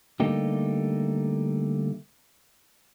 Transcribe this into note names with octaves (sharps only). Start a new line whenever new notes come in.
D3 G3 A3 A#3 D#4 G4